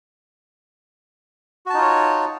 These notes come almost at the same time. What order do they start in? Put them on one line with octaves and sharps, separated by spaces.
F#4 A5 D#4 F4 C#5